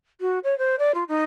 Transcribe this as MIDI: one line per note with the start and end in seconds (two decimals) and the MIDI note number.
0.20 0.39 66
0.44 0.57 73
0.58 0.75 72
0.79 0.92 74
0.94 1.04 65
1.08 1.24 63